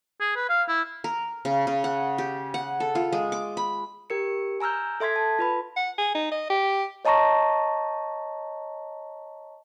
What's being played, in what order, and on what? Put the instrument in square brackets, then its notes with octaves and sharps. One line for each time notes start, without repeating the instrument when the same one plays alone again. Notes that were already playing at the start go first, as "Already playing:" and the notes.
[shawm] G#4
B4
F5
E4
[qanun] A#4
C#3
C#3
F#5
G4
F#5
A4
F4
G#3
D6
B5
[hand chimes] G4 A#4 C#7
G#5 A#5 E6 F6 G6
A4 E5 C6 G#6 B6
A5
F4 B4 B5
[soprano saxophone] F#5
G#4
D#4
D#5
G4
[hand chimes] C#5 D#5 A5 A#5 C#6 A#6